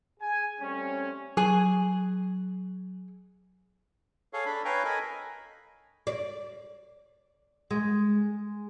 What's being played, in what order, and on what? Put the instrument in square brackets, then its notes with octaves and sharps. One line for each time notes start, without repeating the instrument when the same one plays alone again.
[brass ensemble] G#4 G#5
G3 A3 C4 C#4
[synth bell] F#3 [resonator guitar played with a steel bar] G#4 G#5
[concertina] G#4 A4 C#5 F5
D4 A4 B5
B4 C#5 F5 G5 G#5 A#5
A4 A#4 D#5 G#5 B5
[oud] D5
G#3